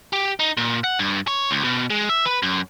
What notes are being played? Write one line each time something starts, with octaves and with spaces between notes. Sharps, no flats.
G4
D#4
A#2
F#5
G2
C#5
C#2
B2
G#3
E5
B4
F#2